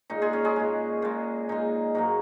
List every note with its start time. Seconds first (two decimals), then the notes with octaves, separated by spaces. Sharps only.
0.10 A#2 G#3 D#4
0.22 G#3 G#4
0.33 C#4 C#5
0.45 G#3 G#4
0.56 A#2 G#3
1.02 A#2 G#3
1.49 A#2 G#3 D#4
1.95 G#2 F#3 A#3 D#4